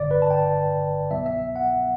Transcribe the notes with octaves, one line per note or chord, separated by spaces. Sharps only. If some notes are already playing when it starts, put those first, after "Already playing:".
Already playing: G1 G2 D3 D5
B4
A5
G5
C2 B2 F#3 B3 E4 E5
E5
F#5